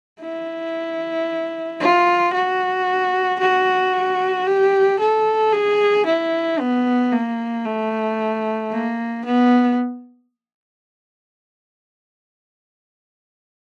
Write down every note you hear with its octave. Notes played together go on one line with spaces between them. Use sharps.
E4
F4
F#4
F#4
G4
A4
G#4
E4
B3
A#3
A3
A#3
B3